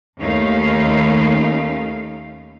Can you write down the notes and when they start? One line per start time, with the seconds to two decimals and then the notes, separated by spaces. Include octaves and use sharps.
0.21 D#2 A3 C#4 D#4 F5